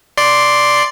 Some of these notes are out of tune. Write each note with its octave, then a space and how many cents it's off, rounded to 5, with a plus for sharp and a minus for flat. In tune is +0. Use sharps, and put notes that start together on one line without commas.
D5 +0 C6 +0